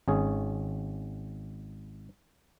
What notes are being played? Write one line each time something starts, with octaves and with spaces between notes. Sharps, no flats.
G#1 C#4 G#4